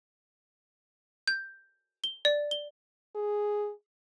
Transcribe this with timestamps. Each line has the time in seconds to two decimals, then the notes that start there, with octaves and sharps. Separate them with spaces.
1.28 G6
2.04 G7
2.25 D5
2.51 G7
3.16 G#4